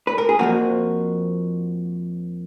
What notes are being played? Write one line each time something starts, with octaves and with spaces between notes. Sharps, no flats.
B4
A#4
G#4
F2 F3 A#3 F#4